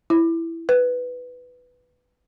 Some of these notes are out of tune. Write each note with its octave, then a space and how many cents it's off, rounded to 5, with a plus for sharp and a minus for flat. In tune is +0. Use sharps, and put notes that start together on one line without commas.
E4 +5
B4 +5